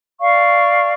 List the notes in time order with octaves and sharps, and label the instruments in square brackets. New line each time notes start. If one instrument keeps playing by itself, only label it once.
[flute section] D5 F5 C#6